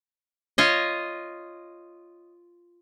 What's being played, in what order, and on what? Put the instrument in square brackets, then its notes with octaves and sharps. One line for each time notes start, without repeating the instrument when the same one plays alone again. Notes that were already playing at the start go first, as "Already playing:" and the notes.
[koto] F4 C#5 D#5